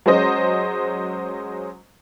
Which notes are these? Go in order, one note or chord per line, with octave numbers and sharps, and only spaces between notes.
F#3 G#3 C#4 C5 D#5